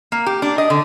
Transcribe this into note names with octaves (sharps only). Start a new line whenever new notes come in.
A#3
G4
D4
D#5
D3